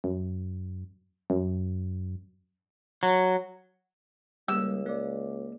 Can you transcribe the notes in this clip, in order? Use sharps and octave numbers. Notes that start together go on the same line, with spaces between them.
F#2
F#2
F#3
C#2 G3 A#3 E6
A#3 D5